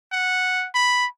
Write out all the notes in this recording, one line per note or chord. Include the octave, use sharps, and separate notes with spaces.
F#5
B5